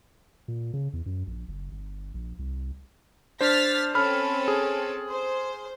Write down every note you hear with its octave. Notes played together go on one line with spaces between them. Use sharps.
A#2
C#3
E2
F#2
A#1
F#1
G1
A#1
C2
D4 C5 F6 A6 B6
C4 C#4 A4 B5 F6
G#4
C5